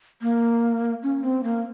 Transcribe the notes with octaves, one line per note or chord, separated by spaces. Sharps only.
A#3
C#4
C4
A#3